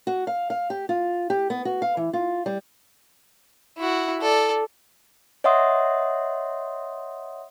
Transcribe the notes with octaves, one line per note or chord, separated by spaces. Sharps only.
F#4
F5
F5
G4
F4
G4
B3
F#4
F5
E3
F4
G3
E4 F#4
A4 D5
C#5 D#5 E5 F#5 C6 D#6